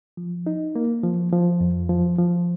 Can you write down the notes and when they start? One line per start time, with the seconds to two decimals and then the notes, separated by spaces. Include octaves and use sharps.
0.17 F3
0.47 D#4
0.75 A#3
1.03 F3
1.32 F3
1.61 F2
1.89 F3
2.19 F3